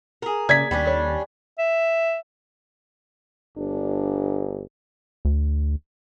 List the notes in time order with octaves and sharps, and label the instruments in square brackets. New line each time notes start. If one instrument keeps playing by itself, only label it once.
[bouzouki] G#4 A#4
[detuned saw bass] C#3 [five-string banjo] A#3 D5 [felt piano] G#6 B6
[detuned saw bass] D#2 [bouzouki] G3 C#4 D4
[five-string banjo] A4 C#5
[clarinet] E5
[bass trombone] G1 [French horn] D4
[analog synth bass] D2